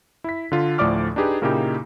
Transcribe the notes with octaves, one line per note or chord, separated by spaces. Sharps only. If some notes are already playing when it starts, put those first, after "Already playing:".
E4 B6
D3 F4
D2 A2 F3 D5 D6 F6
D4 D#4 G4 G#4 B4
A#2 C#3 A#3 D#4 E4 G4